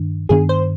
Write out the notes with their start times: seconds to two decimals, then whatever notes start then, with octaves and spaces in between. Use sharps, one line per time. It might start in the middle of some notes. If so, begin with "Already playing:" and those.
Already playing: G2 D#3 D4
0.29 G2 D#3 B3 D4 G#4
0.49 C5